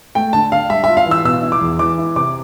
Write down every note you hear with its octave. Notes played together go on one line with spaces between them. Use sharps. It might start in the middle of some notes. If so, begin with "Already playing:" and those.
A3 G5
D3 A5
D3 F5
G3 E5
E5
F4
F5
E3
E6
B2 E6
E4
D6
E2
E3 D6
E4
C3 D6